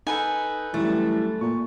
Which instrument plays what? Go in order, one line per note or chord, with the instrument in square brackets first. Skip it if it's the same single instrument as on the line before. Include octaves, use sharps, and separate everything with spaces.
[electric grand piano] D#4 F#5 [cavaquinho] A4 B4 G#5
[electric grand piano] F#2 G3 [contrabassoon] E3 [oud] A3
[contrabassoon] A#2 [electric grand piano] C#6